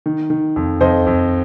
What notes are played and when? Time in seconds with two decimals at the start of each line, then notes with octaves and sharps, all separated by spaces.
0.06 D#3
0.30 D#3
0.56 F2
0.81 F2 C5 D#5
1.07 F2